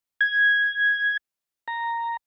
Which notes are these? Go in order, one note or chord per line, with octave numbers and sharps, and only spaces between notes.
G#6
A#5